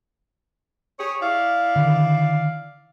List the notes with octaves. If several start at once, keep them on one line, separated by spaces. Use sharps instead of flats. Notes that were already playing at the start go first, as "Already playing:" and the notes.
G4 G#4 C#5
E4 D5 F5
D3 D#3